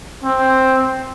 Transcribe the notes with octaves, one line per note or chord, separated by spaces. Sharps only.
C4